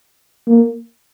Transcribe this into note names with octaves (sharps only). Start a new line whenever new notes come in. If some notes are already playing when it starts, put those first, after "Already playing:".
A#3